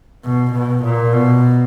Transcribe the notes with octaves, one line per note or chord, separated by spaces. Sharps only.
B2
B2
A#2
B2